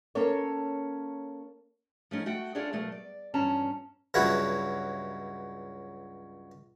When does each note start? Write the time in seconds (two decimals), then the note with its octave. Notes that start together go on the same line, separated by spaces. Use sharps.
0.15 A#3 C#4 A4 C#5
2.11 F3 A3 C#4 D#4
2.26 A3 F#4 F#5 G5
2.55 C#4 D4 F4 G#4 A4 D5
2.72 B2 F#3 A3 A#3
2.92 D5
3.34 E2 G2 F3 C#4 A5 A#5
4.14 C#2 G2 F#3 E4 F#5